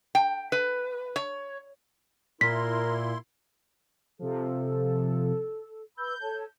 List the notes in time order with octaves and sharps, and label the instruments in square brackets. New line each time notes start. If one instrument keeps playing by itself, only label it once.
[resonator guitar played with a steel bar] G5
B4
C#5
[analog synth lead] A#2 [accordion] E4 C6 [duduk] A#4 [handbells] B6
[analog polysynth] C3 F3 [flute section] A4
[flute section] B4 B5 E6 [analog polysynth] G6
[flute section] A4 C#5 A5